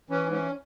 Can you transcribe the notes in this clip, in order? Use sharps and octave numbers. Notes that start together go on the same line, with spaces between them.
E3 C#4
G#2
C#4